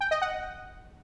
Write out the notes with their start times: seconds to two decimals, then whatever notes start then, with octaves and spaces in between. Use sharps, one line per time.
0.01 G5
0.11 D#5
0.22 F#5